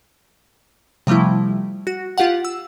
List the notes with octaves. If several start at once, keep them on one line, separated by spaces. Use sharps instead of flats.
C3 F3 G3 A3 E4
F#4
F4 G4 F5 F#5
E6